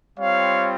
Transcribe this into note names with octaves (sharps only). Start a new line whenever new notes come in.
G3 C4 F4 C#5 F5